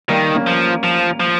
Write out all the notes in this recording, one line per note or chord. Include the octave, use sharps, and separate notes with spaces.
D#3 G3 A#3
A#3 C#4
F3
F3
F3